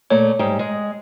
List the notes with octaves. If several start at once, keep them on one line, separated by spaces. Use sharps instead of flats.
A#2 A3 C#5
G#2 G3 G5
G#3